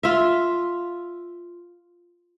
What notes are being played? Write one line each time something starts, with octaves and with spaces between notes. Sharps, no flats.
F4 E5